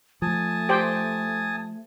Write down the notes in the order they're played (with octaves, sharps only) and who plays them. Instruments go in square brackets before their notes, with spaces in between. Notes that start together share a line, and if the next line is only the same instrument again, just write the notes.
[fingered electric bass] F3 [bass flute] A3 [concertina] G#5 A5 D#6
[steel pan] G4 C5 G5